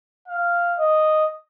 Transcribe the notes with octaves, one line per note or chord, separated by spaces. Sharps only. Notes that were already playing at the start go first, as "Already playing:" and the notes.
F5
D#5